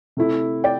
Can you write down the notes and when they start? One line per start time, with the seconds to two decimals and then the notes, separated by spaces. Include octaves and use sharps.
0.17 C3 A3 E4
0.64 D5 G5